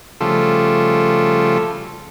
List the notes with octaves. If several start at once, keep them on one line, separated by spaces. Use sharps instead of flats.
C#3 F3 G3 A3 F4 A4